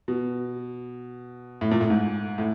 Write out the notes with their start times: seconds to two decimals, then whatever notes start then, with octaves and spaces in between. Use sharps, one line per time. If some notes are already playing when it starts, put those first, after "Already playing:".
0.08 B2
1.61 A2
1.71 A#2
1.81 A2
1.90 G#2
2.38 A2